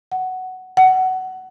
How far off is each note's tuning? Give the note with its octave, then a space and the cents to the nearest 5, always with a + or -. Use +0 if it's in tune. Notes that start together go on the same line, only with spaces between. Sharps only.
F#5 +10
F#5 +20